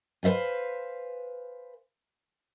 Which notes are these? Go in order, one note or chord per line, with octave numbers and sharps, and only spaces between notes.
B4 C5 E5 F5 G#5